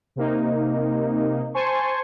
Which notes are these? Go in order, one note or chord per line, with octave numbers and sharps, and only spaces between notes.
C3 A#3 D#4
C5 G#5 A5 C6 C#6